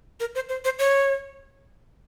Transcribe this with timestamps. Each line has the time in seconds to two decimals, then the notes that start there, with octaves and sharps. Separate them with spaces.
0.20 A#4
0.35 C5
0.49 C5
0.65 C5
0.79 C#5